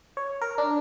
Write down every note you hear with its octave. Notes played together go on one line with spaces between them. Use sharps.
C#5
A#4
D4